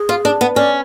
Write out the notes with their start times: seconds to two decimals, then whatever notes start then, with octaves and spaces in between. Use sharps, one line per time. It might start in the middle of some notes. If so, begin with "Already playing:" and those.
Already playing: G#4
0.09 F4
0.25 D4
0.41 B3
0.56 C#4 D5